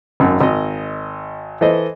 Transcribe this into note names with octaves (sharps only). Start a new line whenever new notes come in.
G#1 F#2
G#1 D#5
E3 A4 C5 D#5